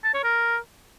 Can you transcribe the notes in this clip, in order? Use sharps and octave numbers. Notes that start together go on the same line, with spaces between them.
A5
C#5
A#4